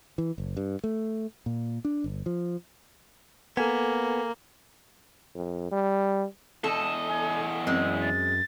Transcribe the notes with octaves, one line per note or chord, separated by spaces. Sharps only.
E3
F#1
G2
A3
A#2
D4
G1
F3
A#3 B3 A4 G#5 G#6
F2
G3
E2 A4 D#5 E7
G#5
F#2 G#3 C4 E6
A6